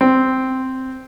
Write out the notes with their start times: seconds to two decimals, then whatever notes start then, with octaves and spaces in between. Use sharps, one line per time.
0.01 C4